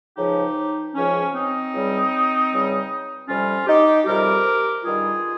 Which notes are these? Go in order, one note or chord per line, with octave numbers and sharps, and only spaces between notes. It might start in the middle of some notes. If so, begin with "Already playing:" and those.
C#2 C#3 F3 D#4 G4
C#2 C#3 F3 C#4
C4 D#4
C#2 C#3 G3
C#2 C#3 G3
F2 C3 G3 C#4 F4
D#4 G4
F2 C3 G3 G4 A#4
G2 D#3 G3 F4 G#4